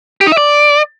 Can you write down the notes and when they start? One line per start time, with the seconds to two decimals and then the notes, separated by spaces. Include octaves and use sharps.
0.21 G4
0.26 D#4
0.32 E5
0.37 D5